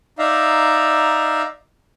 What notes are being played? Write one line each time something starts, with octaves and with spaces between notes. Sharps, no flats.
D#4 D5 E5 F5 A#5